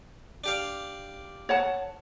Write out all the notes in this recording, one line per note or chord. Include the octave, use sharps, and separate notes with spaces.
D4 G4 F5
C#5 F#5 A5